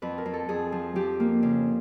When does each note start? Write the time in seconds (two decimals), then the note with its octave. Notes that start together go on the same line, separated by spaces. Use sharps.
0.02 F2 B4
0.18 A#4
0.26 F2
0.34 A4
0.49 F2 G#4
0.72 F3
0.95 F3 G4
1.20 A#3
1.43 C#3